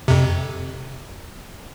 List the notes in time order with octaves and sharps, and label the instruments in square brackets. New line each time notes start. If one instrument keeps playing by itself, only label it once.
[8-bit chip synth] F2 C3